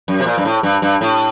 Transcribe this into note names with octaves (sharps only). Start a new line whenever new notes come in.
F#2
C3
A#2
G2
A2
G2
G2
A2